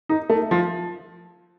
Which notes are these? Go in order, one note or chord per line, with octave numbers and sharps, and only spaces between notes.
D#4
A3
F3